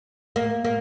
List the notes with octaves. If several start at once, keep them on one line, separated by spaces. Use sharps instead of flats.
A#3
A#3